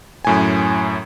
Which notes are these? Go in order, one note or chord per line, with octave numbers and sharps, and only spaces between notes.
F#2 A2 G#5